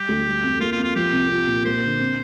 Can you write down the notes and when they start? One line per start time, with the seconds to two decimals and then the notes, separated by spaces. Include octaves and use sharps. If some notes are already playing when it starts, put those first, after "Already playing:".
Already playing: G3 G4
0.08 D2
0.25 G3
0.44 F2
0.60 A#3 F4
0.72 F4
0.78 F2
0.84 F4
0.96 F3 G4
1.12 C2
1.30 F4
1.47 A#2
1.65 A#3 C5
1.83 D3
1.99 C4